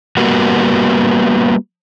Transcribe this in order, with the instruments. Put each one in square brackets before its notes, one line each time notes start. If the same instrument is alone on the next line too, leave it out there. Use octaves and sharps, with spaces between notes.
[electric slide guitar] G3 A#3 B3 F#4